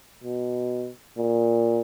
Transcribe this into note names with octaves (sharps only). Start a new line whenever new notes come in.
B2
A#2